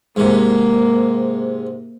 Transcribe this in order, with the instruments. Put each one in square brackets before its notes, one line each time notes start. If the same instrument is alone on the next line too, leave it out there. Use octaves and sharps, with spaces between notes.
[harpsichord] G#2 C3 [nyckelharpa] A#3